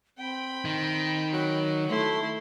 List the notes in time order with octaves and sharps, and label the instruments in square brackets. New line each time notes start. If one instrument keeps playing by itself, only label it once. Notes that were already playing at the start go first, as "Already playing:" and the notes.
[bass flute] C4 [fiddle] G5 B5
[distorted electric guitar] D#3
[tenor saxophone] F#3
[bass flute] A3 [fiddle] E4 C6